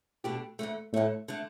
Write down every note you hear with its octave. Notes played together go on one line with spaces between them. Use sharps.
B2 A3 D4 G4
D2 D3 A3
D2 A2 D3 A3
D3 A3